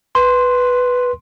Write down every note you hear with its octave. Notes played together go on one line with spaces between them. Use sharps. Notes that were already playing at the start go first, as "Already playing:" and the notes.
B4 C6